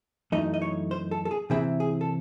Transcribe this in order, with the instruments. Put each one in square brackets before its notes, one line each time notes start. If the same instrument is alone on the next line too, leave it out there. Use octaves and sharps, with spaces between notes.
[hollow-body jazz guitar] F#2 E3 A3 D#4 D#5
D#5
C#5
C5
A4
A4
G#4
C3 E3 C4 E4 G#4
G#4
A4